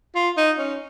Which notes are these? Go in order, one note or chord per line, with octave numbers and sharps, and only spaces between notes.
F4
D#4
C#4